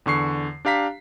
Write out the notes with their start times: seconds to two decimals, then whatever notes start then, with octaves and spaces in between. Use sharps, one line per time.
0.06 E2 D3 C#6 C7
0.65 D4 G4 F5 A#5 B6